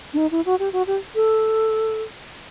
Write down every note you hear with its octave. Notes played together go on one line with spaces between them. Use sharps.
D4
D#4
E4
F#4
G4
F#4
G4
A4